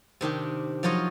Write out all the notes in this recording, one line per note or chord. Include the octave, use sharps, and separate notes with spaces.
C3 D#3 D4 G4
F3 F#3 F4 C#5 D#5